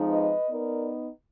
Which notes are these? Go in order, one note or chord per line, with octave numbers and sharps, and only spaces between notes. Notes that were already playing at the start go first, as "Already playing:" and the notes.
Already playing: F2 F3 G#3 D#4
B4 D#5
B3 D#4 A#4 D5